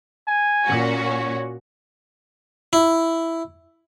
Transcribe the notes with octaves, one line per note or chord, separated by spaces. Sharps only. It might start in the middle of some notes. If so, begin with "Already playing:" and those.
G#5
A#2 C#4 F#4
C#5
E4